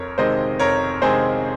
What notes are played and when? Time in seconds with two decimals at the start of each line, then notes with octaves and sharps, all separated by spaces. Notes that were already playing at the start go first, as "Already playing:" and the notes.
Already playing: F2 A#4 C#5
0.18 C3 D#3 G#3 C4 C5 D#5
0.59 F2 A#4 C#5
1.01 C3 D#3 G#3 C4 G#4 C5